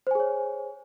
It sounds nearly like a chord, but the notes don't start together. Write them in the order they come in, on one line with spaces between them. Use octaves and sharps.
C5 G#5 G#4 C#5